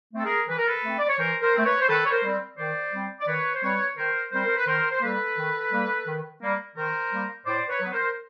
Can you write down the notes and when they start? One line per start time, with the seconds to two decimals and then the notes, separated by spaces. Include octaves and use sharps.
0.14 A3 C4 A4
0.25 G#4 A#4
0.48 E3 B4
0.58 A#4
0.67 A4 B4
0.83 A3 C4
0.98 D5
1.09 C#5
1.19 E3 A#4 C5
1.42 A#4 C5
1.54 A3 C4
1.65 B4 C#5
1.80 C5
1.88 D#3 A4 B4
2.05 C#5
2.11 A#4 C5
2.23 G3 C4
2.57 D#3 C5 D5
2.93 G3 C4
3.20 D5
3.28 D#3 B4 C#5
3.55 C5
3.62 G3 C4 B4 C#5
3.97 D#3 A#4 C5
4.32 G3 C4 A#4 C5
4.45 A#4
4.57 B4
4.67 D#3 A#4 C5
4.91 C5
5.02 G3 A#3 A4 B4
5.37 D#3
5.71 G3 A#3
6.07 D#3
6.41 G3 A#3
6.76 D#3 A#4 C5
7.11 G3 A#3
7.46 A2 C5 D5
7.69 B4 C#5
7.81 F#3 B3 B4
7.92 A#4 C5